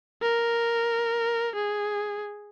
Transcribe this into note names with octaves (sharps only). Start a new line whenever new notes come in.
A#4
G#4